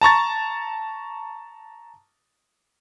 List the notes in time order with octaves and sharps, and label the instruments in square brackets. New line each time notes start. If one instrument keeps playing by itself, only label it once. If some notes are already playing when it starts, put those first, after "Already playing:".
[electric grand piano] A5 A#5 C#6 A6